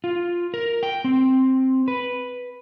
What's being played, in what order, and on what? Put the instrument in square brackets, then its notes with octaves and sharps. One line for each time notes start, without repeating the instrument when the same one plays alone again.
[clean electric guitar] F4
A#4
G5
C4
B4